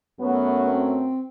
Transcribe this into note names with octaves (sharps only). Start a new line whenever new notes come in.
F#2 F#3 A3 B3
C4